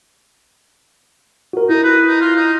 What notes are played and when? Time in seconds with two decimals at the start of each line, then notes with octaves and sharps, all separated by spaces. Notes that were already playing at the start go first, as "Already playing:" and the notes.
1.53 F#4 A#4
1.69 D#4 E4
1.83 B4
2.06 D#4
2.21 F4
2.36 D#4